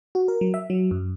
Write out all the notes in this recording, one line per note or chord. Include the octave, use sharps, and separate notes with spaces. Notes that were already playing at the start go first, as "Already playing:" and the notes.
F#4
A#4
F#3
E5
F#3
F#2